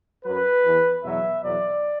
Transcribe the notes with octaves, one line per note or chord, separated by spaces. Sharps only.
F#2 F#3 B4
E2 E3
E2 B2 F#3 E5
E2 B2 F#3 D5